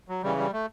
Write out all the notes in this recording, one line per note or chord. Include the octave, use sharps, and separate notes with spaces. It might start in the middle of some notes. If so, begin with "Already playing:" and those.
F#3
C#3 E3 G3
G3
A3